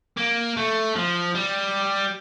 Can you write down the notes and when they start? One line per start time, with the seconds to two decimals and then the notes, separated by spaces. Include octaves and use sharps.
0.17 A#3
0.57 A3
0.96 F3
1.35 G3